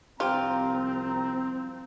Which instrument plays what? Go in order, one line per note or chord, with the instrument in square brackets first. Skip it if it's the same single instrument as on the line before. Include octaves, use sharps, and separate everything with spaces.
[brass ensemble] C2 F3 A#5 [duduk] C4 [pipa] F4 [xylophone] G4 C5 G5